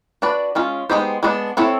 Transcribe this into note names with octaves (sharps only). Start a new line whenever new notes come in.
D4 F#4 B4 D5
G#3 C#4 F4
G#3 B3 D#4 G4 C5
G#3 B3 D4
C4 E4 A4 C#5